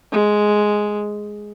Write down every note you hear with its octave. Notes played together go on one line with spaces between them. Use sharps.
G#3